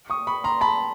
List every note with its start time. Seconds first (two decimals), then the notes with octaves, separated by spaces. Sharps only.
0.10 C#6 D#6
0.27 B5 C#6
0.44 A#5 C6
0.61 A5 B5